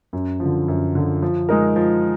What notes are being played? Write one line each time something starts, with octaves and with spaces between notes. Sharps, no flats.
F#2
D3 F3
F#2
D3 F3
F3
G#3 D#4 A#4
F3